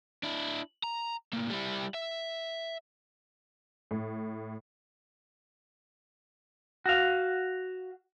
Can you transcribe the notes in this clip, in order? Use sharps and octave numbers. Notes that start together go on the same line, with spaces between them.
D4 E4
A#5
A2 A#3
G3 E4
E5
A2
F#4 F5